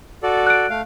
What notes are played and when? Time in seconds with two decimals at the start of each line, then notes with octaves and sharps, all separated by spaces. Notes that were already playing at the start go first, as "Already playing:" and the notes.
0.23 F#4 A4 D5
0.47 F#6 D7
0.70 A3 F5